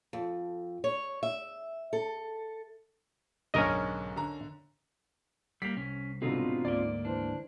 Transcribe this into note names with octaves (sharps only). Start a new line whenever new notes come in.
F2
C#5
E5
A4
B1 G#2 D3 C#4 A#4 D#5
D3 A#5
G3 A#3 B6 C7
C2 C#4
G#2 B2 D3 C4 D#4 F4
D2 G#2 A#3 D5
E3 D4 C5